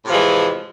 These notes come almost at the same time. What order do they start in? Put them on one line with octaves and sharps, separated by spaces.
A2 C3 F3 E3 G#3